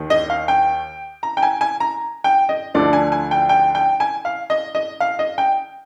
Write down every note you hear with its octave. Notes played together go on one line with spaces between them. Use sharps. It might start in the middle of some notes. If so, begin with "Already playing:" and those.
Already playing: D#2 D#3
D#5
F5
G5
A#5
G5
G#5
G#5
A#5
G5
D#5
D2 D3 F3 D5
G#5
G#5
G5
G5
G5
G#5
F5
D#5
D#5
F5
D#5
G5